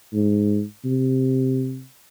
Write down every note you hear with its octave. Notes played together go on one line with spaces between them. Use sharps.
G#2
C3